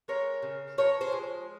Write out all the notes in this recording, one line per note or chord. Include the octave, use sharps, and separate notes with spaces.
G#3 A#4 C#5
C#3
F3 A#4 C#5
G#4 C5
G#3